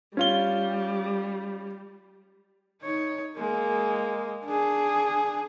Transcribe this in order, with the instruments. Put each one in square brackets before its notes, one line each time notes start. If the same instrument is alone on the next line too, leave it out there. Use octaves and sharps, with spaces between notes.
[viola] G3 [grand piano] C#4 F4 G7
[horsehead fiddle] D#4 C#5
G#3 A#3
D4 G#4